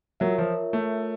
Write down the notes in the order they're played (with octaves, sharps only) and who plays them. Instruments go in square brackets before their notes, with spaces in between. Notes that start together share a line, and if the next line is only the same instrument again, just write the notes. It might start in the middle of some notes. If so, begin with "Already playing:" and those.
[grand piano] F#3 [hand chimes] F4 A#4 C#5 E5
[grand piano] F3
A3